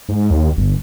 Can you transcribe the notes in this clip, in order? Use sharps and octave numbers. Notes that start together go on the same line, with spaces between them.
G#2
D#2
G1